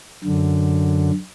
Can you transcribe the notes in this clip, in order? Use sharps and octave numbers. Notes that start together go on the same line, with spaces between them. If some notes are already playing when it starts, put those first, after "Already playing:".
F#2 D3